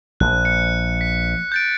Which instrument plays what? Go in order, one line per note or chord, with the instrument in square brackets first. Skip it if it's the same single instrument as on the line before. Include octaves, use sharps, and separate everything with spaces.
[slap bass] A#1 [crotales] F#6
[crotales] C#7
B6
G6 A6 D7